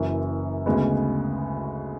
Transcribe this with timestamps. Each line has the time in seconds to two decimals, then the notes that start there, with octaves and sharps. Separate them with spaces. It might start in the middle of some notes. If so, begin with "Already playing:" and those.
Already playing: F#1 F#2 E3
0.66 D2 C#3 G#3 B3